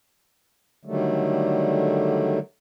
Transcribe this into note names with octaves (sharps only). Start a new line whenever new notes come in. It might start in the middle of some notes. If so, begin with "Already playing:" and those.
D3 D#3 F#3 G3 A3